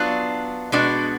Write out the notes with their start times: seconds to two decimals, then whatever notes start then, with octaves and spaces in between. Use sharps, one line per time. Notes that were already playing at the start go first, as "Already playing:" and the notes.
Already playing: F#3 B3 D4 F4
0.72 B2 G#3 B3 D4 F#4